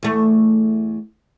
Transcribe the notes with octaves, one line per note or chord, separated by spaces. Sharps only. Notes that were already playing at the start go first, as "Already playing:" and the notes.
E2 A3